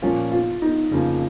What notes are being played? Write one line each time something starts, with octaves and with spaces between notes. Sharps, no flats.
A#2 F3 A#3 C#4 F4
F4
D#4
F2 C#3 F3 A#3